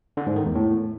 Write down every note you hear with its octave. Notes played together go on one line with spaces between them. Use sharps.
D3
G#2
D#3
E2
A2